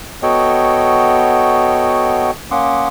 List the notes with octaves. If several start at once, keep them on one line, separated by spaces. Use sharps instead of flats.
B3 F#4 A4 C#5 D#5 G5
A#3 C#4 F#5 C6 D6 D#6